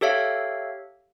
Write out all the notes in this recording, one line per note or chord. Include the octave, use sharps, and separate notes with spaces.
G4 A4 C#5 E5 F5